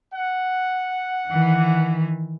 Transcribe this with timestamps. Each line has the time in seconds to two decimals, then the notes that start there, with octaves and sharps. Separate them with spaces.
0.13 F#5
1.29 D#3 E3